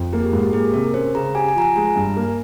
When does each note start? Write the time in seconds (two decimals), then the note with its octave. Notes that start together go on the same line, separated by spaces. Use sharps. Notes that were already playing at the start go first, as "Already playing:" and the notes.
Already playing: F2
0.13 A#3 G#4
0.23 G4
0.33 G#2 F4
0.43 G4
0.53 A#3 G#4
0.74 C3 A#4
0.94 C#4 C5
1.15 C#3 A#5
1.35 G4 G#5
1.48 G#5
1.56 F3 A#5
1.62 G#5
1.76 G#3 A#5
1.96 G2
2.16 A#3